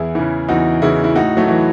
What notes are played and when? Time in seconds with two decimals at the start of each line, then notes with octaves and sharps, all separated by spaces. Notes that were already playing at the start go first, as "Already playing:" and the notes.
Already playing: E2 E4 G#4
0.15 C#3 E3
0.48 E2 D#4 F#4
0.82 C#3 E3 E4 G#4
1.04 E4
1.15 A2 D#4 F#4
1.37 F#3 A3
1.48 E3